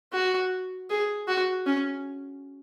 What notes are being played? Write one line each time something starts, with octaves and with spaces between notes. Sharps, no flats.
F#4
G#4
F#4
C#4